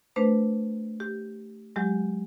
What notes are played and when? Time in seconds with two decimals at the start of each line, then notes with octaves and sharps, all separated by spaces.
0.16 A3 D4 B4 C5
1.00 G4
1.76 F#3 G#3 G4